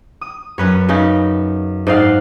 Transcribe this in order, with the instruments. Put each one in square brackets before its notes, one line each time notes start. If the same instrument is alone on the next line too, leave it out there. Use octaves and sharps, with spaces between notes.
[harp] D#6
[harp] F#2 [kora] C#4 B4 C#5
[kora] C#3 C#4 D#4
[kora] G#2 D#4 F5 [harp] D5 F#5